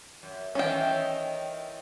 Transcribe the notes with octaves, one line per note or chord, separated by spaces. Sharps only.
F#2
D#3 E3 C#4 E4 G5